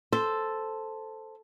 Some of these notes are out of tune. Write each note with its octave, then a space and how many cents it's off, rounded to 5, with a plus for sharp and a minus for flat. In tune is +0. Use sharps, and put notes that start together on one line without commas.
A4 +0 C5 +0